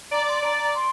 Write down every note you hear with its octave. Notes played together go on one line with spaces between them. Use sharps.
D5 A#5
C6
D5 A#5
A#5
C6